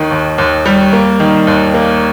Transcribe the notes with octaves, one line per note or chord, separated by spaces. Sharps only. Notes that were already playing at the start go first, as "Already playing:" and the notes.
Already playing: D#2 D#3
D#2
D#2
G3
A#3
D#3
D#2
A#3